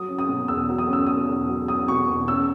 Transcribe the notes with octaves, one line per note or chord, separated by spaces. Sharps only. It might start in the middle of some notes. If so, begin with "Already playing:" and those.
Already playing: F#3 D#6
C#4
D#6
B2
E2 E6
F#3
D#6
C#4 E6
B2 D#6
E2
F#3
C#4 D#6
B2 C#6
E2
C#4 E6